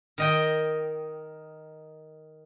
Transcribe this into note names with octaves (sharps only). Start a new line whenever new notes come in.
D#3 D#5 G5